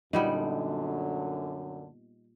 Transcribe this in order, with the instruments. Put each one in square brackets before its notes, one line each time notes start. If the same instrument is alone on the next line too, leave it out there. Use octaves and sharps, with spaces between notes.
[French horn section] F#2 D3 [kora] A#2 G3 B3 [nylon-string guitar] D#4